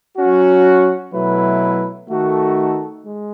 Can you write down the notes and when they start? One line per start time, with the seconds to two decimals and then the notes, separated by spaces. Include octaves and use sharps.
0.18 F#3 C#4 F#4
1.13 B2 F#3 A3 E4 B4
2.08 D#3 A3 D#4 F#4 A4
3.03 G#3